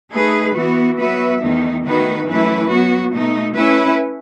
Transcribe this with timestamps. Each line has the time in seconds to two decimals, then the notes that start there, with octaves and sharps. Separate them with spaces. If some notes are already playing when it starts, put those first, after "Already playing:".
0.11 A3 D#4 G#4 B4
0.55 E3 B3 F#4
0.98 F#3 B3 F#4 B4 E5
1.40 E2 D#3 A3 D#4
1.83 D#3 A3 D#4 F#4 B4
2.27 F#2 E3 A3 E4 B4
2.69 F#3 B3 F#4
3.13 B2 A3 D#4
3.55 A3 C#4 E4 B4 E5